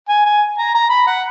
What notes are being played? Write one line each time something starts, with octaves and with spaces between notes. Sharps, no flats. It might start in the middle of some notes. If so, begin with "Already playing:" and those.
G#5
G#5
A#5
A#5
B5
F#5